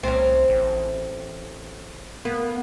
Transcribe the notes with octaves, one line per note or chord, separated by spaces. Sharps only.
C2 C4 C#4
A1
A#3 B3